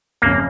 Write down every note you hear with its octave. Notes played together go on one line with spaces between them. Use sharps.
F#1 F2 C#3 A#3